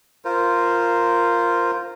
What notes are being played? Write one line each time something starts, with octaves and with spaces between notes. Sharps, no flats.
F4 A#4 C5